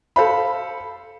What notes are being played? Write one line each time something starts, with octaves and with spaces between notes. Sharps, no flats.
A4 C5 F5 B5